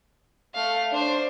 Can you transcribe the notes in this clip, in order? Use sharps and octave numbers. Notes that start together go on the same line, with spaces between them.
A3 F5
D4 C5